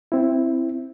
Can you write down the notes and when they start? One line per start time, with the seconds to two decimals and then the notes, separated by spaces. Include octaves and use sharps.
0.12 C4 E4